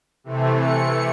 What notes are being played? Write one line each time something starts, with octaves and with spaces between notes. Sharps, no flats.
C3 E3 A3
C#7